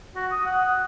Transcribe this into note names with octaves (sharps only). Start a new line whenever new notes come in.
F#4
D#6
F#5